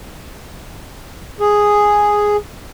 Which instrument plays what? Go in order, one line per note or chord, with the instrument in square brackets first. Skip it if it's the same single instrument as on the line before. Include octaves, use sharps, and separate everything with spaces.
[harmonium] G#4